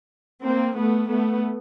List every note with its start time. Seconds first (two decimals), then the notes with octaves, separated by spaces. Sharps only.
0.43 A#3 C4
0.76 A3 B3
1.09 A3 B3